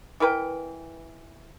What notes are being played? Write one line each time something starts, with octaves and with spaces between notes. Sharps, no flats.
E3 A#4 B4 G5